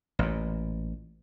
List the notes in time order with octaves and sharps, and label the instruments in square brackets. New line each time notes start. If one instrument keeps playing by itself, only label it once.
[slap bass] A1 A#2